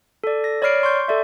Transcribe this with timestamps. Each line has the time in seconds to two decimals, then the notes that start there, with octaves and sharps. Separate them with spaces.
0.24 A4 D5
0.44 A#6
0.62 C#5 D5 B5 F6 C7 D7
0.83 C6 C#6 G6
1.08 A4 D5 E5